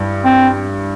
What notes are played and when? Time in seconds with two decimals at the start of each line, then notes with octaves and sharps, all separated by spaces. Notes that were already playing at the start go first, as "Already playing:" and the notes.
Already playing: G2 E4
0.24 C4